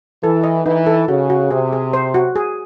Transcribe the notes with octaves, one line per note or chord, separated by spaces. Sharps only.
E3 A4
D#5
E3 D#4
A4
C#3 F#4
F#4
C3 G#4
G#4
C5
F#4
G#4